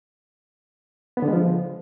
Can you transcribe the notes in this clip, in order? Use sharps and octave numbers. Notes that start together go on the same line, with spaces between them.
B3
D3
G#3
F3